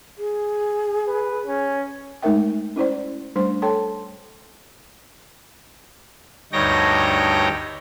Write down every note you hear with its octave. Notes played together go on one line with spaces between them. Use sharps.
G#4
B4
C#4
G#3 A3 D#4 A#4 E5 G5
C#4 E4 C5 D5
G3 A3 D4 C5 C6
A4 C#5 G5 A5 C6
D2 G2 D#4 C#5 G5 A#6